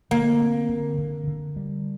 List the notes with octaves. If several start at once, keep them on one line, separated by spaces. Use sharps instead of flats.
D3 A#3
C4
D3
D3
D3
G3